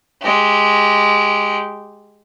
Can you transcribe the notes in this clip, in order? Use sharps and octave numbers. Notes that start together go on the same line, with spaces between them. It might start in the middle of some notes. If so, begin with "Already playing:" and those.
G#3 G4